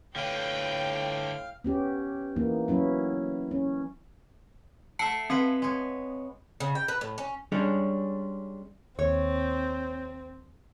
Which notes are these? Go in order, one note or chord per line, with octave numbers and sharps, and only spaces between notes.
A2 D3 B4 F5 G5
B3 C#4 G4
E3 A#3 B3 D#4
F#3 B3 C#4 E4
C#4
A3 E5 F#5 A5 C7 C#7
G#3 B3 C4 B4
G#3 C#5
C#3
G5
B4
A2
C#4
G3 G#3 C#4 D4 G#4 C#5
D#2 C4 C#5